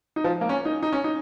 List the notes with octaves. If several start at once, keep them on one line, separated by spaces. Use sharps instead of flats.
D#4
F3
A#3
C#4
D#4
D#4
C#4
D#4